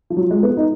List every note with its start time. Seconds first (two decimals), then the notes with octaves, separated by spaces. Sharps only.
0.10 F3
0.17 F#3
0.31 G#3
0.43 B3
0.57 D#4